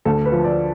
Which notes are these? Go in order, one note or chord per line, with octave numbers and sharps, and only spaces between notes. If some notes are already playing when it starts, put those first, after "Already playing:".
D2 A4
B4
F3
D5